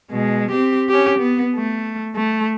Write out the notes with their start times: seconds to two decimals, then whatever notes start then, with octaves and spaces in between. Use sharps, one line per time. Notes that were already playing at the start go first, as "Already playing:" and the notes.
0.11 B2 G#3
0.51 C4 G4
0.89 C#4 G4
1.19 B3
1.56 A3
2.16 A3